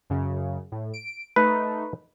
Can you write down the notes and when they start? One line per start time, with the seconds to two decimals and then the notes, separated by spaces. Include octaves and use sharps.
0.10 F#2 C#3
0.72 A2
0.93 D7
1.36 A3 D#4 B4